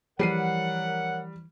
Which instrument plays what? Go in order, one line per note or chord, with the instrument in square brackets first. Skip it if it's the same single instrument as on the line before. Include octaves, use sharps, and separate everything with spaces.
[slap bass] E3 F3 [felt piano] G3 C7 D#7 [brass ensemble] A#4 C#5 F#5